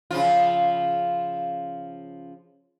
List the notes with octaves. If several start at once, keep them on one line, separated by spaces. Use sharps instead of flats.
C#3 F3 F4